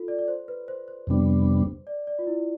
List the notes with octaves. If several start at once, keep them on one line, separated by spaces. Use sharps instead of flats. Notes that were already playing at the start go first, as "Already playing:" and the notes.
Already playing: F4 A4
D5
D5
C5
B4
C5
C5
F2 C3 G3 B3 D4
D5
D5
F4
E4